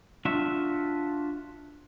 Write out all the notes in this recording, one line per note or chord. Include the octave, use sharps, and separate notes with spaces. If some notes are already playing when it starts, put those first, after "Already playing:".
D4 F4 F#4 E5